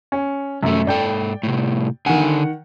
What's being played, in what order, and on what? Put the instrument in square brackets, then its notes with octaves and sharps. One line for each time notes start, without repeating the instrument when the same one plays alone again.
[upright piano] C#4
[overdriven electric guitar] C2 A3 [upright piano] F#2
[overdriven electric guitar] G#2 A4 [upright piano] D5 G5
[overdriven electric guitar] A2 C3
[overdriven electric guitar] D3 G#5 [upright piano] D#3 F#5